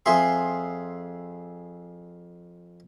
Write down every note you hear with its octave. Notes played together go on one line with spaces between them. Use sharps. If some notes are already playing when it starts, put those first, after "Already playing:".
F2 G#4 E5 C6